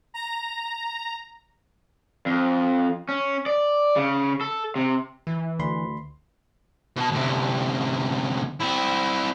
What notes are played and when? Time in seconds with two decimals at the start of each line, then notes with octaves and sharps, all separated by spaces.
0.14 A#5
2.26 F2
3.09 C#4
3.46 D5
3.96 C#3
4.41 A4
4.76 C3
5.27 E3
5.59 D2 B5 C6
6.98 B2 A5
7.12 D2 C3
8.61 C4 E4